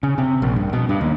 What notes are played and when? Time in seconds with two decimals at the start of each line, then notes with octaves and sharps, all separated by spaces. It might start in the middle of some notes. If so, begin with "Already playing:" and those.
0.03 C#3
0.18 C3
0.42 A#1
0.56 G2
0.73 B2
0.89 G2
1.01 D#2